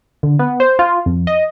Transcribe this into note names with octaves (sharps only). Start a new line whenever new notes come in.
D3
B3
C5
F4
F2
D#5